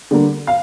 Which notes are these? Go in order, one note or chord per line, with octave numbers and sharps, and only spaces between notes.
D3 G3 A#3
F5